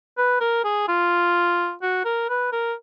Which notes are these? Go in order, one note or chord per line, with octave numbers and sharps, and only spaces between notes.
B4
A#4
G#4
F4
F#4
A#4
B4
A#4